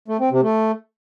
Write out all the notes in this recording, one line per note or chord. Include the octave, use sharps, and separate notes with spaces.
A3
C4
C3
A3